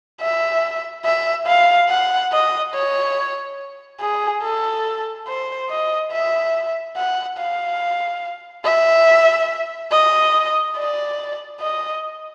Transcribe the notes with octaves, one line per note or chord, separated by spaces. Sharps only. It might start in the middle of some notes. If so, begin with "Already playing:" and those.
E5
E5
F5
F#5
D#5
C#5
G#4
A4
C5
D#5
E5
F#5
F5
E5
D#5
D5
D#5